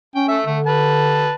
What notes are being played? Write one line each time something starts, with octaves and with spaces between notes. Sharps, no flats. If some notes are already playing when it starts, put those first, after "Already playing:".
C#4 G5
A3 E5
D3 A3
B4 A5